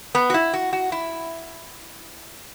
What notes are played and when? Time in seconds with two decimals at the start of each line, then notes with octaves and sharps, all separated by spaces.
0.15 B3
0.30 F#4
0.34 E4
0.53 F#4
0.73 F#4
0.92 E4